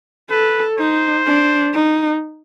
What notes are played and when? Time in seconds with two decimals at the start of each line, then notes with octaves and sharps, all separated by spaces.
0.30 A4 B4
0.78 D#4 C5
1.26 D4
1.74 D#4